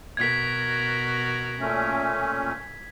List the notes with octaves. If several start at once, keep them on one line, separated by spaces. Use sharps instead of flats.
B2 F#4 A#4 G#6 B6
A#2 A3 C#4